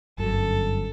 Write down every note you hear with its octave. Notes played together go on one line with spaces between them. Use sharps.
G1 F#2 A4